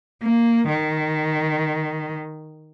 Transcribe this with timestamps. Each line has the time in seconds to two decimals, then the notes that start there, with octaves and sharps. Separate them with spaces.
0.23 A#3
0.69 D#3